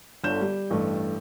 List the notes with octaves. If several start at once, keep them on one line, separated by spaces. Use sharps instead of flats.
G1 D3 C#5 G6 E7
G3
A1 G2 A3